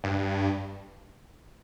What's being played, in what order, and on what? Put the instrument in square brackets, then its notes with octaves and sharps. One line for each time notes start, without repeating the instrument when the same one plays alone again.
[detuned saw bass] G2